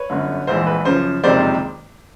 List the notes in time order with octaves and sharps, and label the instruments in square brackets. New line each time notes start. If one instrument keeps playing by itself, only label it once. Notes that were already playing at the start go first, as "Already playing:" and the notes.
Already playing: [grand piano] B4 C#5
G1 F#2 D3
A#1 G#2 E3 C5
B4
F#2 C#3 F3 C5
F#1 F2 C3 D#3 G#3 C5 D5